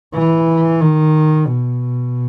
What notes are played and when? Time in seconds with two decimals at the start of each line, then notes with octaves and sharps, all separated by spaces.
0.15 E3
0.81 D#3
1.46 B2